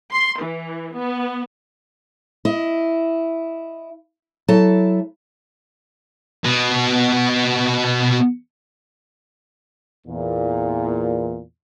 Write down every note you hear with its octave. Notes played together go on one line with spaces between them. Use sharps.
C6
E3
B3
E4 D#5
F#3 E4 A4 A5
B2 B3
E2 A#2